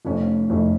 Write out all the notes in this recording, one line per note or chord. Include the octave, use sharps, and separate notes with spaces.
F1 F2 F3 A3 C#4
F1 F2 F3 A3 C#4